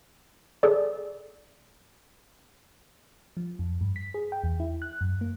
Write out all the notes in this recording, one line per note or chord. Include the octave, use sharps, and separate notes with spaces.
G#4 A4 D5
F3
F2
G2
B6
G#4
G5
E2
E4
F#6
F#2
A#3